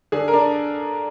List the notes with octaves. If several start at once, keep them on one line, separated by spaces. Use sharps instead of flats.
D3 G#4
A#4
D4